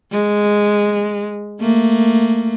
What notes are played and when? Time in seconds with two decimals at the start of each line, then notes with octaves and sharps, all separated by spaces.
0.12 G#3
1.61 A3 A#3